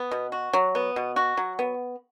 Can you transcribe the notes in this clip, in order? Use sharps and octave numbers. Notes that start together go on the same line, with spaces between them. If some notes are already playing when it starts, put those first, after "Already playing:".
Already playing: B3
B2
F#4
F#3
B3
B2
F#4
F#3
B3